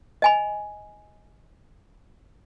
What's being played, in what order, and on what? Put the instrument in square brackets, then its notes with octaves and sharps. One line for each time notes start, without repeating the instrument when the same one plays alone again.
[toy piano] D#5 G#5 B5